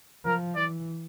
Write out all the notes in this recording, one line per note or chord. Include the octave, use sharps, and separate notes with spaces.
F3 A#4
E3 D5